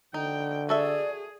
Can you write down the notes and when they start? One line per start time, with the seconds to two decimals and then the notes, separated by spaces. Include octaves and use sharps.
0.14 D3 D#4 G5
0.69 F#4 G#4 A4 D5 E5